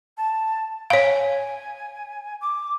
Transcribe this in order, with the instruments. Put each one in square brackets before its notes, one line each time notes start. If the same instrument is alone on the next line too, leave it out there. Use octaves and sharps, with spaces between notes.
[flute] A5
[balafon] C#5 F5 [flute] G#5
[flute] D6